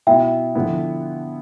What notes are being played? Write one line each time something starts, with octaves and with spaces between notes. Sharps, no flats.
B2 B3 E4 E5 G5
D3 F3 B3 E4